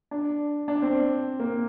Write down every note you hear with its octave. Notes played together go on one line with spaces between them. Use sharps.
D4
D4
C4
A#3